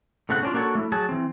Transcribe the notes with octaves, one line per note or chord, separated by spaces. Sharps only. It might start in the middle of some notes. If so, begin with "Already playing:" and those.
A2 C#3 A3 C4 F#5
C#4 D4 F4
A#3 D4 F#4 G4 A4 C#5
A3 D#4 E4
F#3 G#4 A5
E3 C4